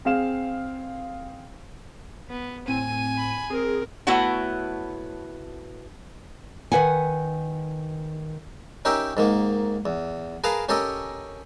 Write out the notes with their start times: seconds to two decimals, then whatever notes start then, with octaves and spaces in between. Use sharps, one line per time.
0.05 C4 G#4 F5 E7
2.29 B3
2.67 A2 C4 G#5 D#7
3.17 B5
3.50 C4 G#4 A#4
4.07 A3 B3 E4 F#4 C#5 F#5
6.72 D#3 B4 F#5 G#5
8.85 C#4 D#4 G4 A#4 E5 G5
9.17 G#2 D#3 A#3
9.86 E2
10.44 G#4 A#4 B4 F5 A5 A#5
10.69 C#4 G4 A4 A#4 D#5